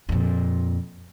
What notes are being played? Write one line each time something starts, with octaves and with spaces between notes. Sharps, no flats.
F2 A#2